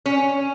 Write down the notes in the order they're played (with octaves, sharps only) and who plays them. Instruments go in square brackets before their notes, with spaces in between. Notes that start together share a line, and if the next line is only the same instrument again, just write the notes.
[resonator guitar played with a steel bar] C#4